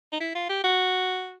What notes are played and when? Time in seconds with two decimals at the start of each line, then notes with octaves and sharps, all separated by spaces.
0.13 D#4
0.21 E4
0.35 F4
0.49 G4
0.64 F#4